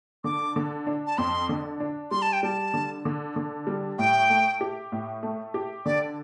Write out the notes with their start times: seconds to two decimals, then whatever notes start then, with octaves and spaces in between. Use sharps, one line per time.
0.24 D3 D6
0.56 D3
0.87 D4
1.07 A5
1.18 F2 C6
1.49 D3
1.80 D4
2.11 G3 C6
2.22 A5
2.33 G5
2.43 G3 A5
2.74 D3
3.05 D3
3.36 D3
3.67 G3
3.98 A2 G5
4.30 A3
4.61 G4
4.92 A2
5.23 A3
5.54 G4
5.86 D3 D5